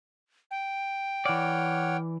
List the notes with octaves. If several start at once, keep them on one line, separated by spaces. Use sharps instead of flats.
G5
E3 C#5 D5 F#5 F6